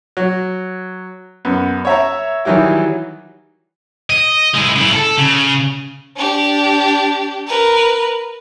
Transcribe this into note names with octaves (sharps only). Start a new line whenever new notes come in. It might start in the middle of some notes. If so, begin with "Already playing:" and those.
F#3
F#2 B3
C#5 E5 A#5
D#3 E3 F#3 G3 E4
D#5
G#3 E4
C#3 E4
A4
C#3
D4 G4
A#4 B4